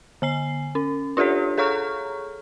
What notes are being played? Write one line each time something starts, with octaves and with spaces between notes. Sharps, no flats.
D3 G#5 C7
C#4
D4 F4 G4 A4 C#5
G#4 A4 C#5 A#5 C#6 F6